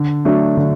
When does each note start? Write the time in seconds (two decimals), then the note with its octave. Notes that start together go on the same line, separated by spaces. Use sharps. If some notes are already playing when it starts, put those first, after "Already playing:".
Already playing: D3
0.25 F#3 A3 D4
0.57 D3